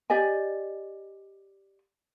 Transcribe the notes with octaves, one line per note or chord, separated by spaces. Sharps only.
G4 D5 D#5 G#5